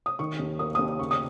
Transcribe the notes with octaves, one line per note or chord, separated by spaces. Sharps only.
D#6
D#3 C#6
D#2
A#3 D#6
D#6
D#2
C#3 C#6
D#6